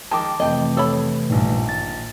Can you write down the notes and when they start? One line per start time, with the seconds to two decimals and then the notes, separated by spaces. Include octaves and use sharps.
0.11 D#3 F3 G#3 G5 A5 D6
0.40 F2 C3 E3 A3 D#5 G5 G6
0.77 A4 C#5 B5
1.30 A#1 G2 A#2 D#3
1.69 A6